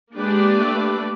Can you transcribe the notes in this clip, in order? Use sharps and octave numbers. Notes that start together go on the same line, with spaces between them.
G#3 A#3 D4 G4 B4 D5
A3